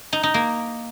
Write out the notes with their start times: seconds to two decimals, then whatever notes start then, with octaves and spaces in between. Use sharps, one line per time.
0.13 D#4
0.23 D#4
0.34 A#3